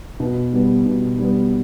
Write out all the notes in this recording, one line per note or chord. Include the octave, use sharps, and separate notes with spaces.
B2
G3 B3
B2
G3 B3